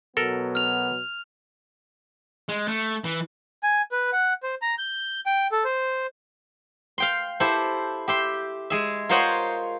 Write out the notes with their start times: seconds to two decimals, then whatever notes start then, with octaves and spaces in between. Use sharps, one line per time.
0.17 B2 F#3 B3 A4 A#4
0.55 F6 F7
2.49 G#3
2.68 A3
3.04 E3
3.63 G#5
3.92 B4
4.13 F#5
4.43 C5
4.62 A#5
4.78 G6
5.26 G5
5.52 A4
5.64 C5
6.98 F5 G5 C6
7.40 E4 G4 A4 C5
8.08 G4 E5 C6
8.70 G#3 G#4 E5
9.09 F4 A#4 C5 C#5 D#5 F#5